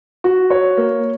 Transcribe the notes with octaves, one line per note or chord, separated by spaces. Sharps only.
F#4
C#5
A#3